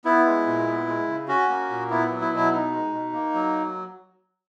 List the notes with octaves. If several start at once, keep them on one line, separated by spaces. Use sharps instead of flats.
B3 E4
G#3
A#2
B3
G#3
C#3
C#4 F#4
A#3
A#2
B3 E4
F#3
E4
B2 E4
B3 D#4
G#3
B2
A#3
F#3